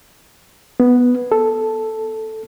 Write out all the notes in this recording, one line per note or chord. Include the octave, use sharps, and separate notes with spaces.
B3
A4